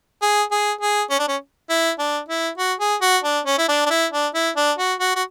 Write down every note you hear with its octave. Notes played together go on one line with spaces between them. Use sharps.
G#4
G#4
G#4
C#4
D4
C#4
E4
D4
E4
F#4
G#4
F#4
D4
C#4
E4
D4
D4
E4
D4
E4
D4
F#4
F#4
F#4